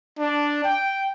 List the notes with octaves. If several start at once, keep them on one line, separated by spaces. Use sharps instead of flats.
D4
G5